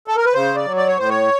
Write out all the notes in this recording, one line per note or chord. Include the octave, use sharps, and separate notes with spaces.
A4
A#4
B4
C#3 C5
D5
F#3
D5
C#5
A2 C5
C#5